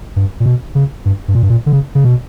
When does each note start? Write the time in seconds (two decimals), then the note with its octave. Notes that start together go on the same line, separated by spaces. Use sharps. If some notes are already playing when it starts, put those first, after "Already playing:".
0.16 G2
0.40 A#2
0.46 B2
0.75 C#3
1.06 G2
1.28 G2
1.35 A#2
1.43 G2
1.50 A#2
1.66 D3
1.73 C#3
1.95 C#3
2.05 B2